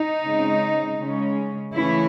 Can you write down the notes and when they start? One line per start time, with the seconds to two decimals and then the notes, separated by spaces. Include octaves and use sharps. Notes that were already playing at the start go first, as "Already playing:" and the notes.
Already playing: D#4
0.24 C#3 G#3 C4
0.98 C#3 G#3 C#4
1.72 C#3 E3 A3 C#4 E4